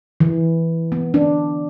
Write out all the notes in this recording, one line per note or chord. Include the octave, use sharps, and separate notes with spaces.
E3
B3
D4